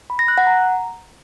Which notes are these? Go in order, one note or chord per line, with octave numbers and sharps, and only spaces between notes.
B5
A#6
F#6
F#5
A#5